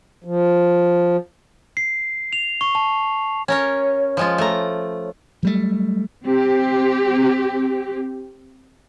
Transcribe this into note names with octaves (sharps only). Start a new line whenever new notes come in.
F3
C7
F7
C#6
A5
C#4 A#4 C#5
F3 G#3 F4
A3 A#5
F#3 G3 A3
C4 G4